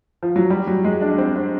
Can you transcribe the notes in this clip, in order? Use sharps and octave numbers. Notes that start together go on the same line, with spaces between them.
F3
F#3
G3
F#3
G#3
D4
C4
C4